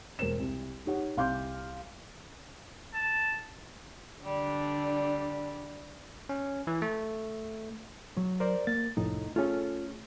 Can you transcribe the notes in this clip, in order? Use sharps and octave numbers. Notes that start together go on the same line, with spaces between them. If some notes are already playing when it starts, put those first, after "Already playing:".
E1 A#4 C5 E7
C2
D#4 G4 C#5 F#5
C2 F5 C6 D6 G6
A5
D3 G3 D4
C#4
E3
A3
F#3
A#4 C5 D5
A#3 A6
C2 F2 A2 D#4
A3 C#4 F4 G#4 A4